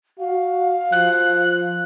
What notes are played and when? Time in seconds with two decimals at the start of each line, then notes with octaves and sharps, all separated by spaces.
0.19 F#4 F5
0.92 F3 F#6